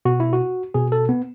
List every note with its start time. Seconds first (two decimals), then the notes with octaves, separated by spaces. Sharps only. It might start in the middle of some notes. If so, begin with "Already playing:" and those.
0.05 B2 F#4
0.20 E4
0.33 F#4
0.74 B2 G#4
0.92 A4
1.09 B3